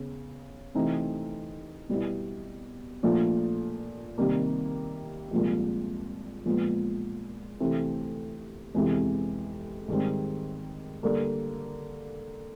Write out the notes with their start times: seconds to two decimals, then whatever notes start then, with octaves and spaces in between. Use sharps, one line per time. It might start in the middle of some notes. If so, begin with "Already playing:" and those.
Already playing: C#3 B3
0.74 C3 E3 A3 C4 D#4
1.89 B2 G3 B3 E4
3.03 A#2 F3 A3 D4
4.18 C3 D#3 G3 A#3
5.31 C2 A#2 F3 G#3
6.46 A#2 F3 G#3 B3
7.60 D2 C3 E3 A3 C4
8.74 F2 C3 E3 G#3 B3
9.88 G#2 D#3 G3 C4
11.03 D3 G3 A#3